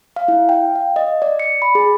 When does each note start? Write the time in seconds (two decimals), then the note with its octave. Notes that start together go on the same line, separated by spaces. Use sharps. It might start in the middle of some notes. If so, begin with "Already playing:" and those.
0.16 F5
0.28 E4
0.49 G5
0.75 F5
0.96 D#5
1.22 D5
1.39 C#7
1.62 B5
1.75 G#4